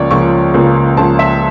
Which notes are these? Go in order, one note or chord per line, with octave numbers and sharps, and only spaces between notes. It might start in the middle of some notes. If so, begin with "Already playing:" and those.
Already playing: C#2 C#3 F3 A#3 C#5 D5
C#2 C#3 F3 A#3 C#6
C#2 C#3 F3 A#3
C#2 C#3 F3 A#3 A5
E5